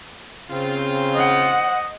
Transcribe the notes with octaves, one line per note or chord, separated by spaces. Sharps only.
C#3 C4 F4
C5 D#5 F#5